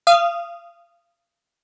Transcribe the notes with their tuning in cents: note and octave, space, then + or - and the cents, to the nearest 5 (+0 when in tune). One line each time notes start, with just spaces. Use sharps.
F5 -30 D#6 -10